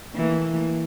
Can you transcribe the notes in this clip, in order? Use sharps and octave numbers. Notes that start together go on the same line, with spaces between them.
E3 A3 A#3